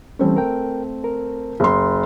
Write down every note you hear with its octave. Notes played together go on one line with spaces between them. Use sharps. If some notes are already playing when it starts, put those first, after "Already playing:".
E3 G3 A3 C4 C#4
A#4 G5
A#4
F#1 C6